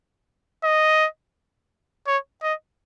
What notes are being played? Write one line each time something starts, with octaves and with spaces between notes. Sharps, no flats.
D#5
C#5
D#5